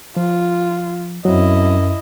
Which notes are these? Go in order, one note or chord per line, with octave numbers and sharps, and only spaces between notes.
F3 F4
F#2 F#3 C4 E4 D#5